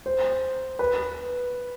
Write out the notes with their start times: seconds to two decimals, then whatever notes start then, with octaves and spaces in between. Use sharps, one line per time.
0.06 C5
0.79 B4